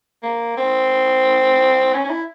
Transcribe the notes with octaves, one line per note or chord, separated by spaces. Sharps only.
A#3
C4
C#4
C#4
E4